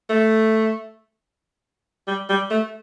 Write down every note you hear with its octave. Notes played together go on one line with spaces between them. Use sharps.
A3
G3
G3
A3